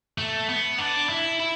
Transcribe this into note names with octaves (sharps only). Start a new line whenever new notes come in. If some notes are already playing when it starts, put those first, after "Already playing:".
A3
B3
D4
E4
E4